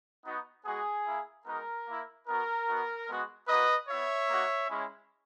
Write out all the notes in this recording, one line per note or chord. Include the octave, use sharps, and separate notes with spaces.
B3 D#4 F#4
G#3 B3 F#4 G#4
A#3 E4
G#3 B3 D#4 F#4 A#4
A#3 E4
B3 D#4 F#4 A#4
B3 D#4 F#4
G#3 B3 F#4
A#3 D#4 F#4 B4 D#5
B3 E4 C#5 E5
A#3 D#4 F#4
G#3 C#4 E4